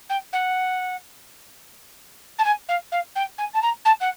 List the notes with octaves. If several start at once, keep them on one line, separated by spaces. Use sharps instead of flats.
G5
F#5
A5
G#5
F5
F5
G5
G#5
A5
A#5
A5
F#5